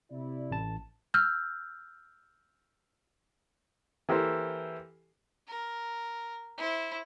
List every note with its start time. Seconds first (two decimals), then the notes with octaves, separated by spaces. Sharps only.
0.11 C3 E4 D5
0.51 A1 A5
1.14 E6 F6 G6
4.09 E3 A#3 G4 A4 A#4 C5
5.48 A#4
6.57 E4 C5